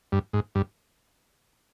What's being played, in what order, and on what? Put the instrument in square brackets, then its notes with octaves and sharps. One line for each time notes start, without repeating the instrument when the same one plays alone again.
[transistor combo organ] G2
G#2
G2